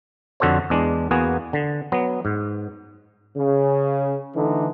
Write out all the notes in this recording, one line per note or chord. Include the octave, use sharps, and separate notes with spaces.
F2 D3 F#4 A4 C5 C#5
E2 G#3 D4
E2 A#3 B3 F#4 G#4 G#5
D3
F#3 B3
G#2
C#3
D3 E3 A3 D4 D#4